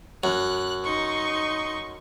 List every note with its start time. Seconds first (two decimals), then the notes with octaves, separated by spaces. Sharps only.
0.24 F#2 F#6
0.84 D#4 C6 C#6